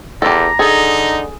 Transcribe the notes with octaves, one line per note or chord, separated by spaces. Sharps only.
E2 G4 A4 A#5
D3 D#4 G#4 A4